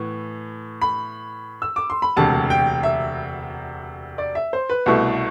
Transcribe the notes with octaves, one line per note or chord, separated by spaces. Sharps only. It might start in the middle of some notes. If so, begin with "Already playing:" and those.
Already playing: A2 E3 B3
B5
E6
D6
C6
B5
E1 D2 C3 A5
G5
E5
D5
E5
C5
B4
C2 B2 A3 E4